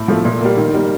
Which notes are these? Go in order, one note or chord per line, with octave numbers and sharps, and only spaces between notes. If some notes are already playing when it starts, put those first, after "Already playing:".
Already playing: A2
F3 A3
A#2
G3 A#3
D#3
G3 A#3